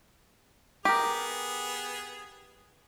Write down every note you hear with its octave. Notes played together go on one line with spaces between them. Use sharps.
B3 G4 G#4 A#4